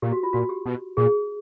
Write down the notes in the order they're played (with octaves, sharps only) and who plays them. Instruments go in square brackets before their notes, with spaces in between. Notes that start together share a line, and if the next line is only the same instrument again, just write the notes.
[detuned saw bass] A#2 [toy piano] G4
[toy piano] F#4
F4
[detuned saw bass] A#2 [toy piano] F#4
[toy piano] G4
[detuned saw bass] B2
[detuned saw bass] A#2 [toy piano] G#4